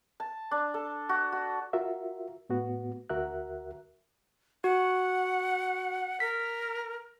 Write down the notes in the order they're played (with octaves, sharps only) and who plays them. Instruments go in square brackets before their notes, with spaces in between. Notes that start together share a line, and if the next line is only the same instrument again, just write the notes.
[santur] A5
D4
A4
F#4
F#4
[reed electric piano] F4 F#4 A#4 E5
A2 B3 F#4
D2 F#4 A#4 E5 F#6
[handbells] F#4 [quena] F#5
[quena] A#4 [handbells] B6